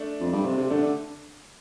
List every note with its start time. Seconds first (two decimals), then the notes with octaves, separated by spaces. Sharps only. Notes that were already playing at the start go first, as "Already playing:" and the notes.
Already playing: A3 D4
0.20 F2
0.32 G2
0.45 C3
0.57 C3
0.70 D3 A3 D4
0.82 D3